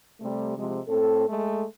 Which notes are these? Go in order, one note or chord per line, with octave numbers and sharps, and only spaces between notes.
C3 G3 A3
C3 F3 G#3
A2 C4 A4
G#3 A3 A4